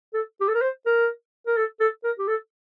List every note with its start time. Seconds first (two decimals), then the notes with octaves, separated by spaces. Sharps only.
0.14 A4
0.41 G4
0.48 A4
0.55 A#4
0.61 C5
0.86 A#4
1.47 A#4
1.57 A4
1.80 A4
2.04 A#4
2.19 G4
2.28 A4